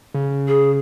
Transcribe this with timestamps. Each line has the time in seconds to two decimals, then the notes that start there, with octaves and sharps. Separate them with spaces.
0.14 C#3
0.48 G#4